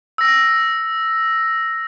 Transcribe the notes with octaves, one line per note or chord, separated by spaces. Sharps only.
E6 A#6